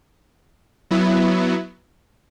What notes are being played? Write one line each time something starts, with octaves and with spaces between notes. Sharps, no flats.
F#3 B3 E4